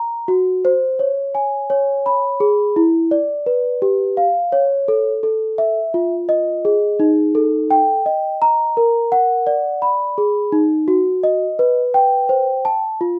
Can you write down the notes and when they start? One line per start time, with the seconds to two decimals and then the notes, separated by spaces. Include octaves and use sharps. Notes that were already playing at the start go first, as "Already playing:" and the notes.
Already playing: A#5
0.28 F#4
0.65 C5
0.99 C#5
1.35 G#5
1.70 C#5
2.06 B5
2.40 G#4
2.76 E4
3.11 D5
3.46 B4
3.82 G4
4.17 F5
4.52 C#5
4.88 A4
5.23 A4
5.58 E5
5.94 F4
6.29 D#5
6.65 G#4
7.00 D#4
7.35 A4
7.71 G5
8.06 D#5
8.42 A#5
8.77 A#4
9.12 F#5
9.47 D5
9.82 B5
10.18 G#4
10.52 D#4
10.88 F#4
11.23 D#5
11.59 B4
11.94 G5
12.29 C5
12.65 A5
13.01 F4